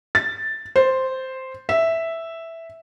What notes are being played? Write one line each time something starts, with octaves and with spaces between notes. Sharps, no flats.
A6
C5
E5